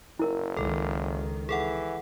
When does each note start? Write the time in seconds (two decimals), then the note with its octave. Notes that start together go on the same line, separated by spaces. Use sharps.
0.19 F#1 E4 A#4
0.57 C#2 D#3 A4
1.49 E3 G#4 A4 F#5